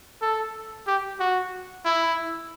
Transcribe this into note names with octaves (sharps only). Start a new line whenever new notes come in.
A4
G4
F#4
E4